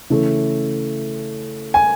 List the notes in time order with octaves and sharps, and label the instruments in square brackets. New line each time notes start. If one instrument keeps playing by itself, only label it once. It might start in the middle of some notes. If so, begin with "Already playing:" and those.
[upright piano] C#3 E3 A3
G#5